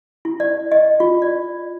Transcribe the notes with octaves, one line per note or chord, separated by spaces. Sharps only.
E4
D5
D#5
F4
D5